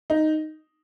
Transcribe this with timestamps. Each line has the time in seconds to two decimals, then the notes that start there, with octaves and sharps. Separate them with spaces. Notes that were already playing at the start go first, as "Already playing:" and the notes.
0.10 D#4